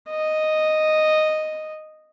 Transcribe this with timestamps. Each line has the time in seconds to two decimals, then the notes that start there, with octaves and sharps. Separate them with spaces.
0.10 D#5